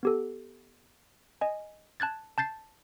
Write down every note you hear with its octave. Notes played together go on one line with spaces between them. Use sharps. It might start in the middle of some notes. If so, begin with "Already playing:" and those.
B3 G4 A4
D#5 G#5
A5 F#6 G#6 A6
A5 G6 A6 C7